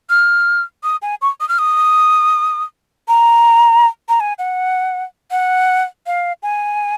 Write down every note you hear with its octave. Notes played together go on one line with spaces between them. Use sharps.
F6
D#6
G#5
C#6
D#6
F6
D#6
A#5
A#5
G#5
F#5
F#5
F5
G#5